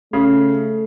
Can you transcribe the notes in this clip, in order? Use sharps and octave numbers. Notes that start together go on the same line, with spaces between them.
C#3 A3